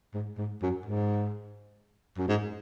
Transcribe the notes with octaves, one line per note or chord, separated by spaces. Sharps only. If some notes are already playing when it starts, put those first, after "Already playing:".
G#2
G#2
F#2
G#2
F#2
G#2